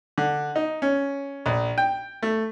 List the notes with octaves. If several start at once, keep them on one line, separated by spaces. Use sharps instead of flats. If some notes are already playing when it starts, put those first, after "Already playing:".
D3
D#4
C#4
A#1
G5
A3